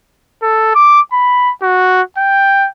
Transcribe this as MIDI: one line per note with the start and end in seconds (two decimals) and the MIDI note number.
0.43 0.70 69
0.75 1.01 86
1.13 1.51 83
1.62 2.02 66
2.18 2.68 79